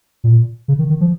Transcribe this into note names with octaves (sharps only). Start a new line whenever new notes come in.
A#2
C#3
D#3
D#3
F3